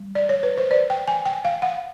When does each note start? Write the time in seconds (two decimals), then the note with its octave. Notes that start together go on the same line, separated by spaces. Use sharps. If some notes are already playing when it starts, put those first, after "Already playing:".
Already playing: G3
0.15 D5
0.29 C#5
0.43 B4
0.57 C5
0.71 D5
0.90 G5
1.08 G#5
1.25 G5
1.45 F5
1.62 F#5